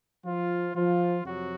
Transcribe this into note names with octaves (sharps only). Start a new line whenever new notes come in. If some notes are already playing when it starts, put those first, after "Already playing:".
F3 F4
F3 F4
F2 C3 F#3 F#4